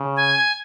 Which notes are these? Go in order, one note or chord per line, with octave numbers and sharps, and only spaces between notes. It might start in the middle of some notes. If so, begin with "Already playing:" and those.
Already playing: C#3
G#5